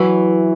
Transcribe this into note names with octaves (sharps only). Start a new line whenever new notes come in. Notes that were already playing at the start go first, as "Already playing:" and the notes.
Already playing: E3 F#3